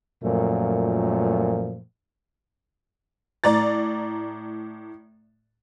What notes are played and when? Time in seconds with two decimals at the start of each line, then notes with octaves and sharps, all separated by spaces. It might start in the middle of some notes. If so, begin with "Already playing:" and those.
0.24 F#2 A#2 F3 A3
3.44 A2 D5 A#5 A6